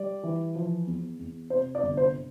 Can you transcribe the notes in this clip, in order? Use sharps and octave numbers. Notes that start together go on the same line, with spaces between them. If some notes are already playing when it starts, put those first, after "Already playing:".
Already playing: G3 D5
E3
F3
E2
E2
C3 C5
D5
G1
C5